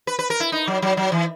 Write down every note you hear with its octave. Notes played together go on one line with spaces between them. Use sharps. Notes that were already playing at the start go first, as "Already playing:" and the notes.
B4
B4
A#4
E4
D#4
F#3
F#3
F#3
E3